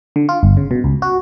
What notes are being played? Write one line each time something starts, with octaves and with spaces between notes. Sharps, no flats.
D3
F4
G1
C#3
B2
C#2
F#4